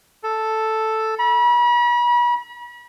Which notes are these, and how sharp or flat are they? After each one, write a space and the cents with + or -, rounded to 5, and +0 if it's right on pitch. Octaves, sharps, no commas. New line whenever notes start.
A4 +0
B5 -40